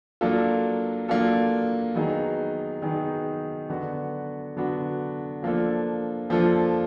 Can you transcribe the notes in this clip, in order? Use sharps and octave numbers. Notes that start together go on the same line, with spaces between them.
F#3 A#3 D4 F4 A4
F#3 A#3 D4 F4 A4
D#3 F#3 B3 D#4 G#4
D#3 F#3 B3 D#4 G#4
D3 F#3 B3 D4 F#4
D3 F#3 B3 D4 F#4
F3 A#3 D4 F4 A4
F3 A#3 D4 F4 A4